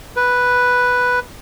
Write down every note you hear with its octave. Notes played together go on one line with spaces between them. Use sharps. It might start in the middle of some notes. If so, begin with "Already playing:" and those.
B4